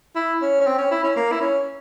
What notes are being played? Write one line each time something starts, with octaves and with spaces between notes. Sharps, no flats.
E4
C#4
C#4
C4
C#4
E4
C#4
A#3
E4
C#4